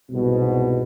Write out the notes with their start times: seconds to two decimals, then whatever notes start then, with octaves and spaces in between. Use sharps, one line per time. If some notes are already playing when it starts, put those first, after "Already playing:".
0.11 C2 G#2 B2